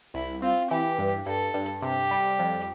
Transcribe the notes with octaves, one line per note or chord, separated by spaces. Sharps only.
C2 E4
C4 F4
E3 G4
G2
G2 A4
G2
C3 G4
G3
F2